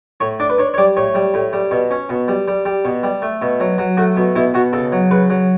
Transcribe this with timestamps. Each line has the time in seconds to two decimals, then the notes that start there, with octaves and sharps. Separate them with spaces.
0.20 A2 C#5
0.40 D4 D5
0.50 B4
0.58 D4 C#5
0.74 C#5
0.78 G3 D5
0.97 A2 C#5
1.15 G3
1.34 A2
1.53 G3
1.71 B2
1.91 C#4
2.09 B2
2.28 G3
2.48 G3
2.65 G3
2.85 B2
3.03 G3
3.22 A3
3.42 B2
3.60 F#3
3.78 F#3
3.97 A3 F#4
4.16 B2
4.35 B2 E4
4.54 B2 F#4
4.73 C#3 A4
4.92 F#3
5.11 C#3 B4
5.30 F#3